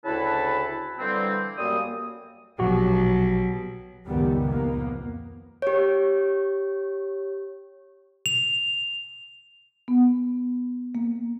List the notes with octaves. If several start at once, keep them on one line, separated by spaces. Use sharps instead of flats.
D2 C#3 E4 A4 B4 A5
D3 E3 G3 A#3 C4
F#2 G3 A#3 D#6
A#1 B2 F#3 F#4 G4
C#2 F#2 A#2 D#3 G3 B3
F2 A#3 B3
G4 C#5
F7
B3
A#3